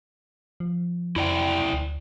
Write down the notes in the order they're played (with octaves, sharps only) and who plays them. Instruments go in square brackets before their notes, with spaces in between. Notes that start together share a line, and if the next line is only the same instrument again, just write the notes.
[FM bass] F3
[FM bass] F2 [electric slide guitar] E4 D5 G5
[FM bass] D2